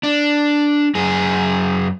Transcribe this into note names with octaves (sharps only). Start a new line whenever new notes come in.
D4
F#2 G#4